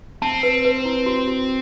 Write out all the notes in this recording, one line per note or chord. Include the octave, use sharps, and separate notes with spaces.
C4 A5
B4
B4
E4
F#4
F#4